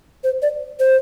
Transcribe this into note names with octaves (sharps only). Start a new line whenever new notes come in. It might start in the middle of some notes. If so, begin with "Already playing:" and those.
C5
D5
C5